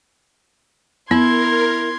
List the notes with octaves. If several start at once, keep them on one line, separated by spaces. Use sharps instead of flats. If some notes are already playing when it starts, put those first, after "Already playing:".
B3 E4 A#4 C6 G#6